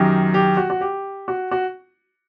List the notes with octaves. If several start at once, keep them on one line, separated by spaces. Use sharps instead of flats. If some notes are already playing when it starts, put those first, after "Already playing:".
Already playing: F#2 D#3 G4
G4
F#4
F#4
G4
F#4
F#4